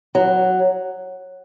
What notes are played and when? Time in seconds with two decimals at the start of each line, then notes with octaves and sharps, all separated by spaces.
0.15 F#3